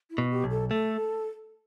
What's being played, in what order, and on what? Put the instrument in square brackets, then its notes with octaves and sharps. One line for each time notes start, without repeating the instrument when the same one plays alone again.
[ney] E4
[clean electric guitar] B2
[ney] G4
[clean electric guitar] B1
[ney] A4
[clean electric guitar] A3 [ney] A4